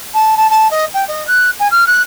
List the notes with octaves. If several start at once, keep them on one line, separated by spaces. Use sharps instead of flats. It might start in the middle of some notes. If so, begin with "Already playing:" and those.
A5
A5
A5
D#5
G5
D#5
F#6
G#5
F6
F#6